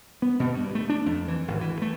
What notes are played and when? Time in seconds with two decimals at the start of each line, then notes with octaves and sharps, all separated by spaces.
0.22 B3
0.40 B2
0.54 G2
0.75 A3
0.89 D4
1.06 F2
1.28 E3
1.48 G#1
1.61 E3
1.82 A3